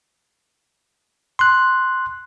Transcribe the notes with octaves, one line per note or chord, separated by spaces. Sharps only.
C6 F#6